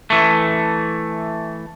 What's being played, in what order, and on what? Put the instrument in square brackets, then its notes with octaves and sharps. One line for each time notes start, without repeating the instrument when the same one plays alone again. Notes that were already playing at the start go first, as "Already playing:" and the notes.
[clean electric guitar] E3 A3